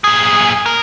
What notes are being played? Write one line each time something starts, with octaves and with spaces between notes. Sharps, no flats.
A#2 G#4
A#4